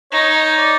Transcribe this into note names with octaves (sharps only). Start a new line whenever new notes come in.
D#4 C#5
D5